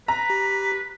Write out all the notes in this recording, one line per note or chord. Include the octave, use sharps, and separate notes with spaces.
B4 A#5
G4